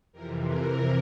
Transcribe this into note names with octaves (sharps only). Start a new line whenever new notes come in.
F2 C3 E3 A#4
A#4